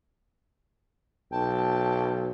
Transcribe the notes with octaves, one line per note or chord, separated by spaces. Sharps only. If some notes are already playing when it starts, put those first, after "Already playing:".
B1 G5 A5